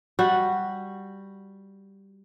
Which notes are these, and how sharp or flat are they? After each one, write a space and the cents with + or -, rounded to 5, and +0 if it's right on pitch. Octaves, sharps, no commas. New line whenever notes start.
G3 +0 F#4 +0